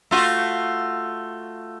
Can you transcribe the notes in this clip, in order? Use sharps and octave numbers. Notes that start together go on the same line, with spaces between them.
A3 F4 F#4